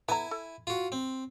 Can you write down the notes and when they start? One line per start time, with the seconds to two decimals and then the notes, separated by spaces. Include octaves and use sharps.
0.09 B3 E4 A4 G#5 A#5
0.31 A4
0.67 F4 F#4
0.92 C4